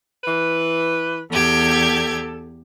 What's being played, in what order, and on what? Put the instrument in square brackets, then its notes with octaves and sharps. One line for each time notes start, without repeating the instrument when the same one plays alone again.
[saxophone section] E3 B4
[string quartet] E2 G4 G#6 [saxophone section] A4